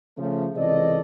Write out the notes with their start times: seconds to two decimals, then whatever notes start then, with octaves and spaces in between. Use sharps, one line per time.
0.18 C#3 F3 A3
0.55 C#2 C3 E3 A4 D5 D#5